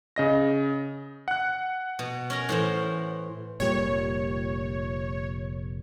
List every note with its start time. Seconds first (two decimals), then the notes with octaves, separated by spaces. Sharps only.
0.16 C#3 D#5 A#6
1.28 F#5 F#6
1.99 B2
2.30 C#4 A#4 A#5
2.49 A2 E3 C5
3.60 F1 A#2 G3 C#5